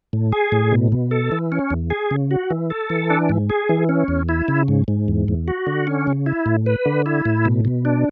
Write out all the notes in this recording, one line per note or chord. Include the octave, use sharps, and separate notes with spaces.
A2
G#4
A2
B2
B2
A4
E3
C#4
E2
G#4
C#3
F#4
E3
A4
E3
D4
G#2
G#4
E3
C#4
E2
E4
C#3
G#2
G#2
E2
E2
F#4
D3
C#4
C#3
E4
A2
B4
D3
E4
A2
B2
B2
D4